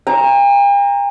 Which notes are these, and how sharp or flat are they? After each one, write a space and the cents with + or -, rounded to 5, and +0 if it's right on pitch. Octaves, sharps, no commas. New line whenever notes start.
G5 +45 A#5 +0